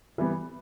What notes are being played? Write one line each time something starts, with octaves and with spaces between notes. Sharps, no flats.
E3 G3 B3